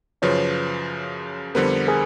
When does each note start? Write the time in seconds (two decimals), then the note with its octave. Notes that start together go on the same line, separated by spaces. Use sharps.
0.22 F#2 C#3 F3 B4 C#5
1.55 F2 D3 G3 B3 A#4 C5
1.88 G#4 A#4